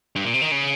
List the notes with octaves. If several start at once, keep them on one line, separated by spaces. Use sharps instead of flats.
G2
A#2
C3
D#3
C#3